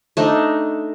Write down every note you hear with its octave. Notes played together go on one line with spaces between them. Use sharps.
A3 D4 D#4